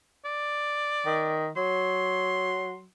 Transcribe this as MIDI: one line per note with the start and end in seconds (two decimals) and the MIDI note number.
0.25 1.46 74
1.06 1.50 51
1.57 2.88 54
1.57 2.80 84